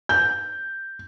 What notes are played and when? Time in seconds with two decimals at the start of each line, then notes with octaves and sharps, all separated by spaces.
0.09 G6